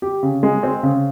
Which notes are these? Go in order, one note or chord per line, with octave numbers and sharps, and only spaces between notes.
G4
C#3
G#3
C4
C#3